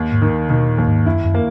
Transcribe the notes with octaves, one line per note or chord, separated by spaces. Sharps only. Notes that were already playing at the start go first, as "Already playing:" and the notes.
Already playing: D#2
G#2
D#3
B2 D#3
A#2
D#2
G#2
F#2 E4
F#2
A#3